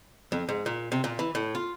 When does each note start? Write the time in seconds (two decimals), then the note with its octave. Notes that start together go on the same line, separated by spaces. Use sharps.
0.32 F2
0.49 G#2
0.66 A#2
0.92 C3
1.04 A#2
1.19 E3
1.35 A2
1.55 F4